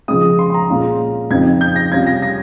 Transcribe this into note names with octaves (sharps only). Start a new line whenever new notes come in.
C#3 F3 G#3 D#6
C6
C6
A#5
A#2 G#3 C#4 F4
F2 C#3 F3 C4 D#4 G#6
G6
A#6
C3 G3 C#4 F4 G#6
A#6
A#6